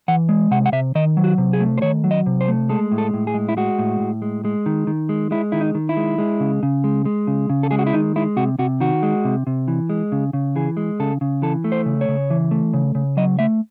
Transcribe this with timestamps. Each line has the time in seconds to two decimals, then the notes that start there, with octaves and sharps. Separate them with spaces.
0.08 E3 F#5
0.29 G#3
0.51 C3 F#5
0.66 F#5
0.72 C3 E5
0.95 D#3 D#5
1.17 F#3
1.24 F#4
1.38 C3
1.53 G#4
1.60 A3
1.78 C5
1.82 D#3 C#5
2.04 F#3
2.11 D#5
2.26 C3
2.41 C5
2.48 A3
2.69 G#3 A4
2.92 A2
2.98 A4
3.14 A2
3.27 G#4
3.34 G#3
3.49 E4
3.57 G#3 F#4
3.79 A2
4.00 A2
4.22 G#3
4.45 G#3
4.66 D#3
4.87 D#3
5.09 G#3
5.31 G#3 E4
5.52 D#3 E4
5.61 D#4
5.75 D#3
5.89 E4
5.97 G#3
6.18 G#3
6.40 C#3
6.63 C#3
6.84 G#3
7.05 G#3
7.27 C#3
7.49 C#3
7.63 A4
7.71 G#3 G#4
7.79 F#4
7.87 E4
7.93 D#3 D#4
8.16 G#3 E4
8.36 C3 F#4
8.59 C3 F#4
8.80 D#3 F#4
9.03 G#3
9.25 C3
9.47 C3
9.68 E3
9.90 G#3
10.12 C#3
10.33 C#3
10.56 E3 G#4
10.77 G#3
11.00 C#3 A4
11.21 C#3
11.42 E3 A4
11.64 A3
11.72 C5
11.86 C#3
12.01 C#5
12.09 C#3
12.30 E3
12.51 A3
12.74 C#3
12.95 C#3
13.17 F#3 D#5
13.39 A3 E5